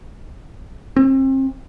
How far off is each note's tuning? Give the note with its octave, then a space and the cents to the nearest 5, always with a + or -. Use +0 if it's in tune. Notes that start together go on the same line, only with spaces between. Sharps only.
C4 +35